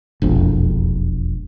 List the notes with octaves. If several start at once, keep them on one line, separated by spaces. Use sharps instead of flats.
E1 A#1 F2